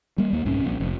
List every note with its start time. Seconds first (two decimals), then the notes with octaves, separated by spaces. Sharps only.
0.18 G3 A#3
0.33 D#2 A#3
0.45 C2 G#2 C3 C#4
0.65 A#1
0.80 F1